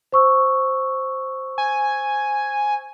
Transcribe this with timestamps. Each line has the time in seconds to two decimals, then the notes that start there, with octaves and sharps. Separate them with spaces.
0.12 C5 C#6 E6
1.58 G#5